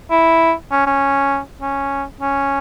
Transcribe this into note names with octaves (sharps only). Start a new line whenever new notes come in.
E4
C#4
C#4
C#4
C#4